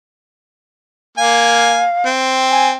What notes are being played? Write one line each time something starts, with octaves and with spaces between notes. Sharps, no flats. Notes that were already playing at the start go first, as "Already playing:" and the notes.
A#3 F5 G#5
C4
G#5